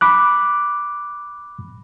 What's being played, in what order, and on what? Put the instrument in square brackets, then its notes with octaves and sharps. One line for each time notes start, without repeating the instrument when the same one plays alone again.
[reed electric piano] B5 D6 F#6